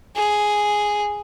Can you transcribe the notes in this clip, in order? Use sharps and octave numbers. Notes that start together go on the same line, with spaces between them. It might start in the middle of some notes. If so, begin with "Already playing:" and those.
G#4